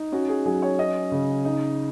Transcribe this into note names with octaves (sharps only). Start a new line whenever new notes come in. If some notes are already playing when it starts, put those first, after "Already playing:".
Already playing: D#4
C#4 F#4
G#4
F#3 G#4
C#5
C#4 D#5
C#3
D#4